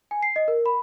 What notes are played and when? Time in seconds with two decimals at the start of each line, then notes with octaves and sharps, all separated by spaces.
0.11 G#5
0.23 C7
0.36 D#5
0.48 A#4
0.66 B5